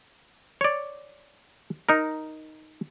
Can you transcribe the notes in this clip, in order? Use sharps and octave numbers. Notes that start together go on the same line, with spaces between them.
C#5 D5
D#4 A#4